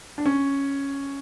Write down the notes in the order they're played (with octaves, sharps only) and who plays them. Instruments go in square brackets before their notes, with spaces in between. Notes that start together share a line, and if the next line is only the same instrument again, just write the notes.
[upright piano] D4
C#4